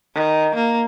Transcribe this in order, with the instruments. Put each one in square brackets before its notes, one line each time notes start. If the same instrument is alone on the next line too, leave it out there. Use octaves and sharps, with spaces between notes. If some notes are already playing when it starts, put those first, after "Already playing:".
[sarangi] D#3
A#3